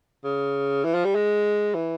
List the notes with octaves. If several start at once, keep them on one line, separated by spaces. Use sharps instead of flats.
C#3
E3
F3
G3
G#3
E3